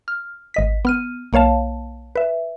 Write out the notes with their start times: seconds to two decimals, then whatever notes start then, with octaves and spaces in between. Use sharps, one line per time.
0.08 F6
0.54 G#1 D#5 B6
0.85 B3 F6 D#7
1.33 B1 A#3 C#5 F5 A5
2.16 B4 E5